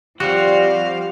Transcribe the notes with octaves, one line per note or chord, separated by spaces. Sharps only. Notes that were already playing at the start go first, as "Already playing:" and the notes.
F3 G3 C4 F#4 G4 F5